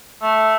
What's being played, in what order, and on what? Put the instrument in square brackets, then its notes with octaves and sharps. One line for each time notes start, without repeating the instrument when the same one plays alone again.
[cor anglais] A3